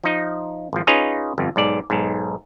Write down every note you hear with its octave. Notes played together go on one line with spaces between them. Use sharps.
F3 D#4
G#1 F3
C#4 D#4 F4 G#4 B4 C#5
G1 F2
B1 G#2 D5
B1 G#2